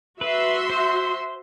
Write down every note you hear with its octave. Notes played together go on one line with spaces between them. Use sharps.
F#4 B4 E5 C6
C5